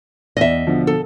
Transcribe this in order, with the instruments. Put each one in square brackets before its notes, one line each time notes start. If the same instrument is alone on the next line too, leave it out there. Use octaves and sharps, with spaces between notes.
[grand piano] E2 [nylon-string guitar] D#5 E5
[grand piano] B2 D3 F3
[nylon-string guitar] A4